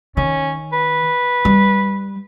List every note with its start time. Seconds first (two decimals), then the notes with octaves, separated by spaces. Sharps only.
0.17 D#3 C#4
0.73 B4
1.45 G3